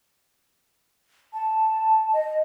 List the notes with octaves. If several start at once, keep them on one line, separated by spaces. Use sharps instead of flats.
A5
D#5